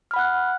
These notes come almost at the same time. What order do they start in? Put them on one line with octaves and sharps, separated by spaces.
F6 B5 F#5 F#6